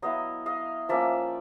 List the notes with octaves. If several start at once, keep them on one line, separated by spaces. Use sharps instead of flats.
F#3 B3 E4 D#5 F5
D#5 F5
F3 A#3 C#4 D5 E5